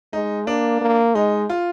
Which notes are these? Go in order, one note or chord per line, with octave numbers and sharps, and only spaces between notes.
G#3 D#4
A#3 D4
A#3
G#3 D#4
F4